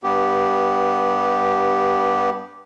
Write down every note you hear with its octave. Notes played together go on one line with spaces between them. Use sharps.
G2 B3 G4